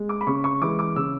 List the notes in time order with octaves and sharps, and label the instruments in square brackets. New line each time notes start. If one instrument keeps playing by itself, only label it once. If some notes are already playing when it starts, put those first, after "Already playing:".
Already playing: [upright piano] G#3
D6
B5
C#3 C#6
C#6
E3 G#3 D6
D6
C#3 E6